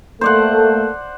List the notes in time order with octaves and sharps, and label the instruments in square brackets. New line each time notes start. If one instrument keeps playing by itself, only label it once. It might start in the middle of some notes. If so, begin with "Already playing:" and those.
[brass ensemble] A3 A#3 A4 [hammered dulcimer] C5 D5 F#5